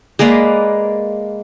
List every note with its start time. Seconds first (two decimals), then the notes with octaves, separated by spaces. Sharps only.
0.19 G#3 A#3 B4 D5